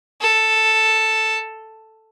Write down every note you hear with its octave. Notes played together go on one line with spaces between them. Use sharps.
A4